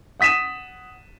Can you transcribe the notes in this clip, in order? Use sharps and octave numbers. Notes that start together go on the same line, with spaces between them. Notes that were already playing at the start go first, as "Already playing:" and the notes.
F#5 D#6 B6 D#7 E7